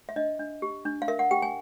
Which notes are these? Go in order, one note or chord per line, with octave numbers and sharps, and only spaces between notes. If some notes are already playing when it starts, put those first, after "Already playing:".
E5
D4 D#5
D4
G4
D4
F5
A#4 E5
F#5
G4 G5
G#5